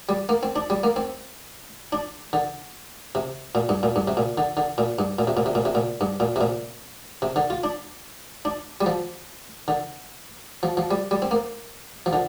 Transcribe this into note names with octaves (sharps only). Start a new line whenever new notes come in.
G3
A#3
C4
D4
G3
A#3
C4
D4
D3
C3
A#2
G2
A#2
G2
C3
A#2
D3
D3
A#2
G2
A#2
C3
A#2
C3
A#2
C3
A#2
G2
A#2
C3
A#2
C3
D3
F4
D4
D4
G3
F3
D3
F3
F3
G3
G3
C4
A#3
F3
D3